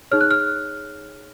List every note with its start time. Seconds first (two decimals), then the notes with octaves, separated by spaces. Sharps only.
0.11 D#4 G#4 C#5 F6
0.21 F#6
0.31 F6